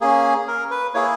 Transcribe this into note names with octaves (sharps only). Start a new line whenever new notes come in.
A#3 C#4 G#4
A#4
B4
A#3 E4 G#4 C#5